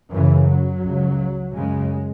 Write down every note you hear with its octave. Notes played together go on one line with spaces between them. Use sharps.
F#2 C#3 E3
F#3
C#2 C#3
F#2 C#3 G#3